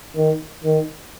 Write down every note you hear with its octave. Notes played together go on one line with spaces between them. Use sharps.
D#3
D#3